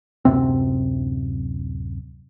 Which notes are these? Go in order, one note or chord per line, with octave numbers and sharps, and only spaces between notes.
D1 F#2 C3 C4